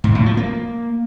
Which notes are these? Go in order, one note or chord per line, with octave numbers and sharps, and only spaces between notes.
G#2
A2
F3
A#3